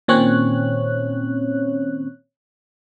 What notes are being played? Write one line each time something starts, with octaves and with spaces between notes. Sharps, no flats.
A#2 D#3 C4 C#4 C#5 F#6